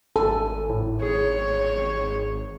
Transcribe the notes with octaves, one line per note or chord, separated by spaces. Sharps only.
G#1 A4 G#5
A2
G#4 C#5